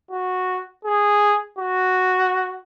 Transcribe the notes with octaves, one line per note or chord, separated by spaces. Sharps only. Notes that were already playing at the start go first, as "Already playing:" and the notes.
F#4
G#4
F#4